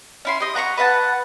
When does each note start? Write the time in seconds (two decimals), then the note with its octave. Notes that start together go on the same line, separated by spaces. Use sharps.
0.25 C#4 E4 C6
0.40 G4 D#5
0.55 F#5 A#5 B5 C#6
0.77 B4 E5 F#5 A5